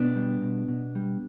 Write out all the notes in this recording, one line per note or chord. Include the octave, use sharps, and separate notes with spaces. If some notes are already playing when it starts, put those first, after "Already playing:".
Already playing: B2 B3 D4
G3
B2
B2
G3